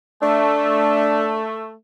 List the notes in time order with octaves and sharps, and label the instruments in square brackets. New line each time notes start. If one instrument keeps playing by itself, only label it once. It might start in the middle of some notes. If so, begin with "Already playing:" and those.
[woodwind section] A3 [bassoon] D4